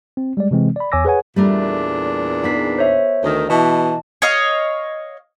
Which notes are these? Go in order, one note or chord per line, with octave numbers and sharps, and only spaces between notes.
C4
G3 G#3 D5
C3 E3 G#3 C4
D5 B5
E2 C#5 G#5 D6 E6 A#6
G#4 B4 C#5 F#5 G#5
E2 A#2 G3 A3 D4 A#4
B3 D#4 G#4 B6 C7
C5 C#5 E5
D2 D#3
B2 E3 D#5 A5
C#5 D#5 F5